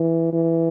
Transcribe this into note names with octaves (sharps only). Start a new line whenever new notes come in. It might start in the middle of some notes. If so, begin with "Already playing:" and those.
Already playing: E3
E3